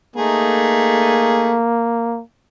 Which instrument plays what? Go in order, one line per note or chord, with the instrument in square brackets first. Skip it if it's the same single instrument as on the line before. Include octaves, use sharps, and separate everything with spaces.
[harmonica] A3 D#4 G#4 [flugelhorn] A#3